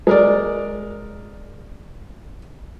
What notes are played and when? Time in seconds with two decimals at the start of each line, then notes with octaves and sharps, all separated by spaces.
0.07 G#3 A#4 D5